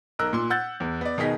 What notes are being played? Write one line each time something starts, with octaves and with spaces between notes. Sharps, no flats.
B1 A#4 E6 F#6
A#2 C6
F#5 E6 F#6 G6 A6
E2
B3 D5
B2 D#3 G#4 D#5 B6